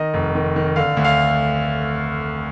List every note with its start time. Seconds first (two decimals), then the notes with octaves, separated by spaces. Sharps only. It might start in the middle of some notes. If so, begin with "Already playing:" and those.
Already playing: D#3 D#5
0.14 F1
0.35 D#3
0.56 D#3
0.76 D3 F5
0.97 D2
1.04 F5